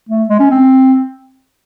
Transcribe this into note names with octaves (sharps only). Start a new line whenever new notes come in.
A3
G#3
C#4
C4